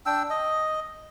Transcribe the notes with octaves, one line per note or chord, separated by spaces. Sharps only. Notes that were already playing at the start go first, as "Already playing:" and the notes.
D4 G5 E6
D#5